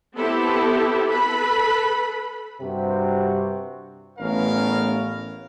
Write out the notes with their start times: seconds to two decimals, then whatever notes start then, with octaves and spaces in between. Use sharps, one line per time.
0.16 B3 C4 E4 G4 A4
1.11 A4 B4 B5
2.61 G2 C3 C4 F#4
4.19 A1 B3 C#4 A#4 F5